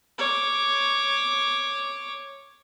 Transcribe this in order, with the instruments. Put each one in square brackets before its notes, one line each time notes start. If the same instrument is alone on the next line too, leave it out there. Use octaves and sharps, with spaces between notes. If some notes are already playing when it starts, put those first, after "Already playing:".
[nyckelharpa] C#5 D6